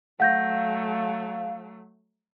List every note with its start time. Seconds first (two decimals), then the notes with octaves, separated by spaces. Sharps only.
0.20 F#3 A3 F5 F#5 G6 A#6